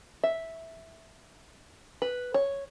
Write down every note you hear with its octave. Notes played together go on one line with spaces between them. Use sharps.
E5
B4
C#5